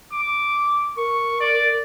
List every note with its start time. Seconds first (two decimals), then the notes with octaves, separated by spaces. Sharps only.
0.12 D6
0.97 A#4 C#6
1.40 D5